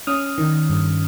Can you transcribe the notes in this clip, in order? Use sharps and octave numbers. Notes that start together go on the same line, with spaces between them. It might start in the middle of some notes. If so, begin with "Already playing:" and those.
C#4 D#6 F6
D#3
G2